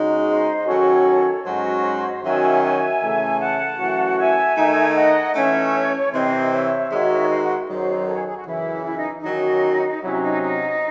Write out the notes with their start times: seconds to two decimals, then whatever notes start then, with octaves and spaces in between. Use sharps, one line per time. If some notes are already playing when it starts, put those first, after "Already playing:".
Already playing: C#3 G#3 D#4 F#4
0.27 C5 D#5
0.56 D#5
0.66 D#3 F#3 C#4 F#4 A4 C#5
1.44 G#2 F#3 C#4 F#4 C5 D#5
2.22 D#3 F#3 C#4 F#4 E5 G#5
2.62 E5 G#5
3.01 C#3 E3 A3
3.39 F#5 A5
3.78 F#2 E3 A3 C#4 F#4
4.18 E5 G#5
4.57 D#3 A3 D#4
4.95 D#5 F#5
5.34 E3 A3 C#4 C#5 E5
6.12 C3 E3 C4 C5 D#5
6.51 C#5 E5
6.90 D#3 G#3 D#4 F#4
7.29 C5 D#5
7.35 E5
7.42 D#5 F#5
7.68 F#2 D#3 F#3 C5
8.07 A4 C#5
8.16 G#4
8.27 G#4
8.36 F#4
8.46 F#2 C#3 E3 E4
8.85 E4
8.96 D#4
9.17 D#4
9.24 D#3 F#3 C#4 F#4
10.02 C3 F#3 C#4 E4
10.22 D#4
10.41 D#4